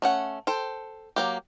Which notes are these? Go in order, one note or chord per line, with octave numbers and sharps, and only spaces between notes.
A3 C#4 F#5
A4 C5 G5
F#3 A#3 G4